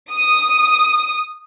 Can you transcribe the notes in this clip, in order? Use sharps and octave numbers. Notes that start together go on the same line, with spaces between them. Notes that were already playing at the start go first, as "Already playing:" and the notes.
D#6